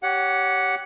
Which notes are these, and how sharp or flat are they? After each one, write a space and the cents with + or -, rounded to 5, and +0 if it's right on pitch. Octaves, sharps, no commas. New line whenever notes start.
G4 -15 C#5 +15 F#5 +0